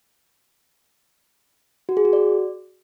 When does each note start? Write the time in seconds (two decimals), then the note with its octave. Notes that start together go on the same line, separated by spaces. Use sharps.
1.89 F#4
1.97 G#4
2.05 F#4
2.13 D5